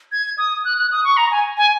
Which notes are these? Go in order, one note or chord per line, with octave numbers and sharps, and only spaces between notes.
G#6
D#6
F#6
F#6
D#6
C#6
A#5
G#5
G#5